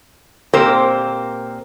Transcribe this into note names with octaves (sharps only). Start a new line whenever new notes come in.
A#2 A#3 C4 G4 A#4 C5